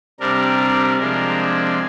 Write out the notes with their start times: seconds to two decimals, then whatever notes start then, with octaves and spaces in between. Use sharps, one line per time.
0.20 C3 G3 D4 A#4
0.99 C3 F3 G#3 D4 A#4
1.40 G#4